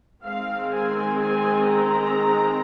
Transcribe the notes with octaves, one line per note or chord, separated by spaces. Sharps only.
D#3 G#3 C4 F5
G#5
G#5
A#5